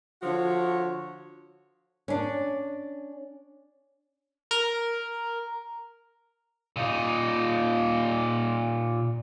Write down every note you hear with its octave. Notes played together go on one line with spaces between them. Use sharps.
D3 F3 F#4 C#5
C#4 D4
A#4
A#2 D#4